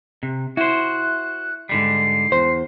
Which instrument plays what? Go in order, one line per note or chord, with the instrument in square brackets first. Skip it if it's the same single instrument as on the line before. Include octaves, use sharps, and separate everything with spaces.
[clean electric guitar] C3
[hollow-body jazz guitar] E4 [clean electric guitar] F#4 C5 [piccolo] F#6
[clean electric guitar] G#2 D3 G3 [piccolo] C7
[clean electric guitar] E2 [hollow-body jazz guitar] C5